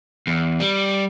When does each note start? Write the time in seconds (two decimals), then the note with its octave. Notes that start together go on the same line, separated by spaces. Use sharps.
0.27 E2
0.60 G3